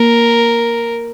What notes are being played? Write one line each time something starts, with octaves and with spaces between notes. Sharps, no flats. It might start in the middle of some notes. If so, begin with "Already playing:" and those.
Already playing: A#3 A#4